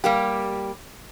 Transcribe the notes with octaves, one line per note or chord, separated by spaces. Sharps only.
G3 A#3 G4